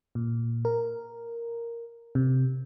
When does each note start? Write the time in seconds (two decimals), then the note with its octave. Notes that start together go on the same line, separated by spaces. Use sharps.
0.15 A#2
0.65 A#4
2.15 C3